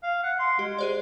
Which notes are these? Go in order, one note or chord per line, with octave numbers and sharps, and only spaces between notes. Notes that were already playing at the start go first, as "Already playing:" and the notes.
F5
F#5
C6
G#3 G4
G#4 C5 D5